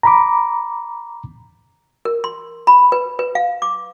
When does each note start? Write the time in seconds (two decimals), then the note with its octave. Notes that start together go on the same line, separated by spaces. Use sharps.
0.03 A#5 B5 D6
2.05 A#4
2.24 C6
2.67 B5
2.92 B4
3.19 B4
3.35 F5
3.62 D6